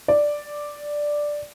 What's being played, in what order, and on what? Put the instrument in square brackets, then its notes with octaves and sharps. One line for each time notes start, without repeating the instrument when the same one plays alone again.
[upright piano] D5